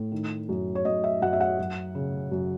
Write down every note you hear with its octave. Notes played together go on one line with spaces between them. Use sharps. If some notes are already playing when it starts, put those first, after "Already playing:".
Already playing: A2
D#3
F#2
C#5
F#2 D#5
E5
F#2 F#5
E5
F#5
F#2
C#3
F#2